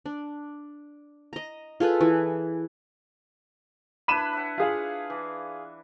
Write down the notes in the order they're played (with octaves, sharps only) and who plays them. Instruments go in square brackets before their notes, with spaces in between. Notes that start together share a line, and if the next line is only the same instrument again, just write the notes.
[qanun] D4
D#5 A#5
F4 G#4 A4 B4
E3
[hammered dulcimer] D4 E4 B4 [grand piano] B5 D#7 E7
[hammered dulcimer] E5 F#5
[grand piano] F4 G#4 F5
[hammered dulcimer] E3